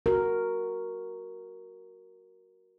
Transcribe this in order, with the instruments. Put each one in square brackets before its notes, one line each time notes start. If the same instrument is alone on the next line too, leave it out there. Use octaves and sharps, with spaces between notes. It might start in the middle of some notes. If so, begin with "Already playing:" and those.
[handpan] F#4 A#4